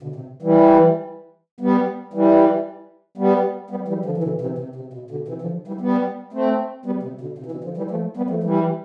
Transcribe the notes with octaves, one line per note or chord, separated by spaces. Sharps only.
B2 D3
C3
E3 G3
G3 B3
E3 G3
G3 B3
G3 B3
E3 G3
D3 F3
E3
B2 D3
C3 E3
C3
C3
B2
B2 D3
C3 E3
D3 F3
E3 G3
G3 B3
A3 C4
G3 B3
C3
B2 D3
C3
E3
B2 D3
D3 F3
E3 G3
F3 A3
G3 B3
F3 A3
E3 G3